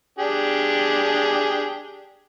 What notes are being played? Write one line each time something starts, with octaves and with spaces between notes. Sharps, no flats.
D4 G4 G#4